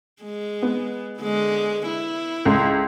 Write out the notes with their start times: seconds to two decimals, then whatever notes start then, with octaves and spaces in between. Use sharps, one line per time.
0.23 G#3
0.62 B3
1.19 D3 G#3
1.87 E4
2.45 C#2 A4 C6